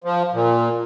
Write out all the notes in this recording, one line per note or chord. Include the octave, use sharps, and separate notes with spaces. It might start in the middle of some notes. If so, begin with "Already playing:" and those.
F3
A#2